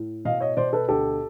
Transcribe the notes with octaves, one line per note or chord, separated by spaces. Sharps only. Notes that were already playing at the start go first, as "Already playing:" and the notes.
Already playing: A2
B2 D#5 F5
C#5 D#5
B2 C5 D5
A4 B4
D2 G4 A4